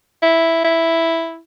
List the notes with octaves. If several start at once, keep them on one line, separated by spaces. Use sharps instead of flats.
E4
E4